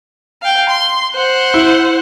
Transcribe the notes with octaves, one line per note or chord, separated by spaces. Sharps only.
F5 G5
C6
C5 F#5
E4